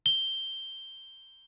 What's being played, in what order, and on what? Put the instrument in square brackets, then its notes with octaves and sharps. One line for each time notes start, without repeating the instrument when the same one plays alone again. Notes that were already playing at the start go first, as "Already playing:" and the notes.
[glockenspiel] G7